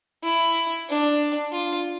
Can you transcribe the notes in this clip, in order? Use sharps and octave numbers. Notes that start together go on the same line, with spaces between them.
E4
D4
F4